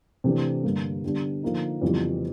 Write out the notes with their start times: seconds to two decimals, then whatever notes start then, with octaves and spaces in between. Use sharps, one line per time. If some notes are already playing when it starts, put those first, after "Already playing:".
0.24 C3 E3 A3 D4
0.63 G2 D3 G3 A#3
1.04 D3 G3 B3 D4
1.43 D3 F3 A#3 D#4
1.82 F2 C#3 E3 G3 B3